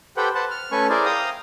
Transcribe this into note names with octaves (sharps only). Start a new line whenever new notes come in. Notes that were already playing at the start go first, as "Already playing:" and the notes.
G4 A4 B4 C5 F#5 G5
B4 C5 F#5 A5
F6
A3 C#4 A4 B4 G#5 C#6
E4 G#4 A#4 C5 D5
F5 G5 A#5 D#6